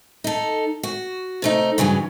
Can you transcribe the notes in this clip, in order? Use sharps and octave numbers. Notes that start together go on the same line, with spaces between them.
D#4 A4
F#4
C3 A3 D#4
G2 C#3 E3 F#3